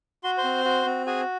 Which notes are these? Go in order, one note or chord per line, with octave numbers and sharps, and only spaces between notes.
F#4 C6
C5 C6
C4
F#4
C4
F#4 G#4 G#5